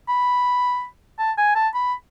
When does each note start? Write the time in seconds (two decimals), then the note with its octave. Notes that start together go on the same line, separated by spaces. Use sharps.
0.09 B5
1.19 A5
1.38 G#5
1.55 A5
1.74 B5